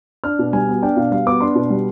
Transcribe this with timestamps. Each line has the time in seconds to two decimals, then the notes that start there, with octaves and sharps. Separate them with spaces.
0.24 D4 F6
0.39 B2
0.53 G3 G#5
0.68 B3
0.82 D4 G5
0.97 B2 F5
1.12 G3 F5
1.27 B3 D6
1.41 D4 C6
1.55 B2
1.70 G3